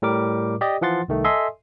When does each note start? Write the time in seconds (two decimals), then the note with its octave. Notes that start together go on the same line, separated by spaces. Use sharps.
0.02 A2 G3 A#4 D6
0.61 G4 D5 D#5
0.81 E3 F3 F#5 C6 A6
1.08 C2 D#3 A3
1.24 A4 D#5 E5 G#5 C6